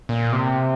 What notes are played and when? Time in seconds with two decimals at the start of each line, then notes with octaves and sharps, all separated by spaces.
0.09 A#2
0.33 C3